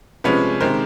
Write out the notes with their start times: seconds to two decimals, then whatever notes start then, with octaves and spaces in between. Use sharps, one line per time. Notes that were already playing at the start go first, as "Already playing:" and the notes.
0.24 C3 F3 G#3 C#4 B4
0.60 C3 D#3 G#3 A#4 C5